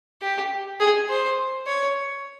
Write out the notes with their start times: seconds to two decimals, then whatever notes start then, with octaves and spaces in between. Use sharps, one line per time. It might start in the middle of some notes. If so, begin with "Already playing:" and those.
0.22 G4
0.80 G#4
1.09 C5
1.67 C#5